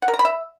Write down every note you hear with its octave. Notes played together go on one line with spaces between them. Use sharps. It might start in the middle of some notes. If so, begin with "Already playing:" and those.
F#5
A#4
A#5
B5
E5